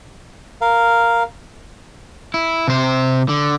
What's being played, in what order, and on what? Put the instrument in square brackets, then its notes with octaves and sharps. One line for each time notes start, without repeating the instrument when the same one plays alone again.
[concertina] A#4 F5
[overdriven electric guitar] E4
C3 C5
D3